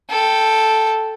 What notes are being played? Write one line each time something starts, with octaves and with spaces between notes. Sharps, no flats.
A4 G5